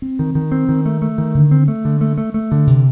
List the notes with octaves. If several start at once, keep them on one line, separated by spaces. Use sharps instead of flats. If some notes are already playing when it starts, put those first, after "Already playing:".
C4
D#3
D#3
C4
D#3
A3
A3
D#3
D3
C4
A3
D3
A3
A3
A3
D3
C3